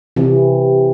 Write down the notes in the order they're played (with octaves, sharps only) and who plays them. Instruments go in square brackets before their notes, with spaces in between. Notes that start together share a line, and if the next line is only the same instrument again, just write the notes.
[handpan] C3 E3